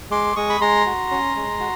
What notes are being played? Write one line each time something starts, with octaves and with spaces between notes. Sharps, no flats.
G#3 C6 D6
G#3 C#6 D#6
B5
G#3 A#5 C6
F#4
C#4
G#3
F#4